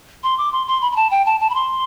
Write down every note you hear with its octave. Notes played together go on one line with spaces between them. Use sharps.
C6
D6
C6
C6
B5
B5
A5
G5
A5
A5
B5
C6